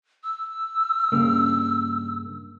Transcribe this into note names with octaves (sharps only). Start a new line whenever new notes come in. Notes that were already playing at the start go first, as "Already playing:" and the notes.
E6
G2 C#3 A#3